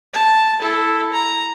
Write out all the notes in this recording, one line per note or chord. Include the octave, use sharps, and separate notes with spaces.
A5
E4 A4
A#5